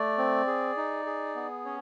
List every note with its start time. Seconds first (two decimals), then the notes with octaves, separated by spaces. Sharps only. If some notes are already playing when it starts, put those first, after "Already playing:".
Already playing: A3 D5
0.18 C4
0.47 G#4
0.77 D#4
1.06 G#4
1.35 B3
1.65 C#4 C#5